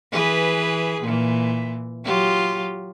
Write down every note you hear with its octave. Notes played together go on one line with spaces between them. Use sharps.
E3 G#4 B4
A#2 E3
F#3 F4 G4